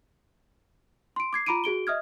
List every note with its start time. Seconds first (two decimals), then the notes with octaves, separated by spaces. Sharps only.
1.16 C6 D7
1.33 D6 G#6 C7
1.46 F4 A#5 B5 D6 D7 D#7
1.64 F#4 G#4 D7 G7
1.87 D#5 E5 D#6 F6 G#6